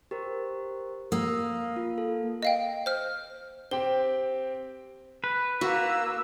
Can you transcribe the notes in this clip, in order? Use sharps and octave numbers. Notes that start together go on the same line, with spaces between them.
G4 A#4 C5
A#3 D#6 E6
F4
A4
D#5 F5 G5
C5 F6
C4 G4 G5 G7
B4
A#3 F#4 E6